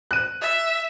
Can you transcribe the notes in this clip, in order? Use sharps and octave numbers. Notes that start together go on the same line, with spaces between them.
F#6 D#7
E5